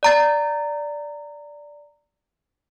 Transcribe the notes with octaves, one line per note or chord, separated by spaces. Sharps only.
D5 A#5 A6